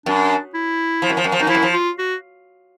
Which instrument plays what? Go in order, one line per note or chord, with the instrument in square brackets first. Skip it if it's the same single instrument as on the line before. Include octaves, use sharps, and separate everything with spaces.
[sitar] F#2 [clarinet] D4
[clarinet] E4
[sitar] F3
F#2
F3
F#2
F3
[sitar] F#2 [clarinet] D#4
[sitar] F3 [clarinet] E4
[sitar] F#2
F3
[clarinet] F4
F#4